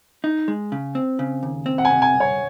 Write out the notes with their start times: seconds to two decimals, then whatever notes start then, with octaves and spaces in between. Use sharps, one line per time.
0.24 D#4
0.48 G#3
0.72 C#3
0.95 C4
1.19 C#3
1.43 D#2
1.66 C4
1.78 F#5
1.85 G#5
1.90 C3
2.02 G#5
2.14 C2
2.20 C#5